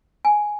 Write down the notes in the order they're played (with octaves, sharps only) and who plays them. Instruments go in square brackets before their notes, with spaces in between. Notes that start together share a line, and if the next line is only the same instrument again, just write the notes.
[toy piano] G#5